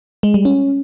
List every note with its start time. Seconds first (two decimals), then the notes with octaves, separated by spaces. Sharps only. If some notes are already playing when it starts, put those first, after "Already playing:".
0.23 G#3
0.34 G3
0.45 C#4